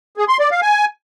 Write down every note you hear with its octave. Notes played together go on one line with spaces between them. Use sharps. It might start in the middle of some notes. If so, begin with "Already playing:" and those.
G#4
C6
D5
F5
G#5